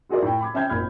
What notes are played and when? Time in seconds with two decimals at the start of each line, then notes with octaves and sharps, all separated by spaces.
0.09 F4 F#4 G#4 A#4 D5
0.22 A2 G5
0.41 B5 D6 G#6
0.54 C#4 E5 G5 F6 G6 G#6
0.69 G#1 A#2 B5 F6 G#6